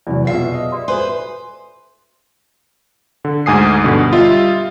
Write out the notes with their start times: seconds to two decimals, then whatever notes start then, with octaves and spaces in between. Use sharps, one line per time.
0.07 E2 C3 F#3 D5
0.27 B2 F4 G#4 E5 C7
0.54 D#5
0.72 G4 D5 C6
0.88 F#4 A4 B4 C5 G#5 C6
3.25 D3
3.46 D2 G#2 G#5 D#6 C7
3.84 G2 B2 D3
4.12 G3 F4 D#5 E5